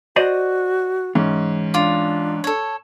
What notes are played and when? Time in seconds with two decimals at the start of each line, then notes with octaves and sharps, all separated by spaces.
0.16 F#4 C5 D5 D#5
1.15 G#2 E3 C#4
1.74 D4 F4 D6
2.44 A4 C#5